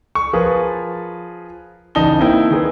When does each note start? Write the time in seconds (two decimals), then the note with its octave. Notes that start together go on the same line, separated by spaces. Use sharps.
0.15 C#6
0.33 F3 F4 G#4 A#4 B4
1.95 A1 C#3 D#4 A5 G7
2.19 A#3 C4 D#4 E4 G5
2.51 D#3 G#4 B4